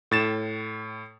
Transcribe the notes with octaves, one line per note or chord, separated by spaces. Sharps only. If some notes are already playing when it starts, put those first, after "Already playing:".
A2 A6 E7